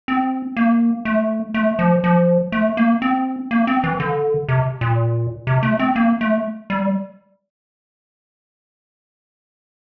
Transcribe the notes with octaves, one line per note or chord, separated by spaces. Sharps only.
C4
A#3
A3
A3
F3
F3
A3
A#3
C4
A#3
C4
E3
D3
C3
A#2
C3
A3
C4
A#3
A3
G3